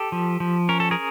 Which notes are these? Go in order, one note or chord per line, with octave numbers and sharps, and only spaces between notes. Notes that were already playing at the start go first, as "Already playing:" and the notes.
Already playing: G4 A4
F3
F3
C#4 A#4
A4
G#4 A#4